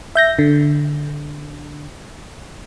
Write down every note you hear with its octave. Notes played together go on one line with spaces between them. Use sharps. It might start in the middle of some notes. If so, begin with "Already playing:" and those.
E5 G6 A#6
D3